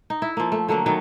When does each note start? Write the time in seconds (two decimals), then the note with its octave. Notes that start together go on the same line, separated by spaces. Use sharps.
0.10 D#4
0.22 E4
0.37 F3 A#3
0.52 A3
0.68 D3 F#3 A3 A#3
0.86 D#3 F#3 B3